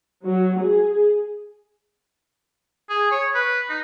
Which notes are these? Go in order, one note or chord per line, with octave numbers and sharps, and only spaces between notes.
F#3
G#4
G#4
C#5
B4
D#4